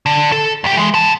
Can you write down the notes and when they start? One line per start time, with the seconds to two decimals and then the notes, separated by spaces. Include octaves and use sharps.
0.06 D3
0.32 A4
0.64 D2 G4
0.77 E3 G#3
0.94 B3 A5